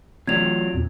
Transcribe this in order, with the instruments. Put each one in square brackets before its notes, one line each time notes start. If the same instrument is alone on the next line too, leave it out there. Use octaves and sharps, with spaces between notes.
[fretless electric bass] E3 A3 C4 [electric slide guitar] F#3 F4 D5 [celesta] G#6 F7
[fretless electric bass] E2 A#2 C4